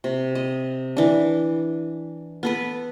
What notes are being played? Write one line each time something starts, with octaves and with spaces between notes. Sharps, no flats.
C3
D#5
E3 D4
B3 A4 B4